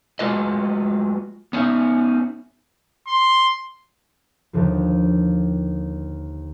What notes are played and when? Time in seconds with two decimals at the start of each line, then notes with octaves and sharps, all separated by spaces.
0.19 F#3 G#3 A3 F4 B4 D#5
1.53 B3 C#4 D#4 E5
3.07 C6
4.53 D#2 D3 F3